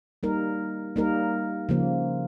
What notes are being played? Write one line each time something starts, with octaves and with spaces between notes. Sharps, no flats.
G3 A#3 D#4 A#4
G3 A#3 D#4 A#4
C#3 F3 A#3